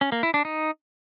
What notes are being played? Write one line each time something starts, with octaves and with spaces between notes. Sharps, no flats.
C#4
A#3
E4
D4
D#4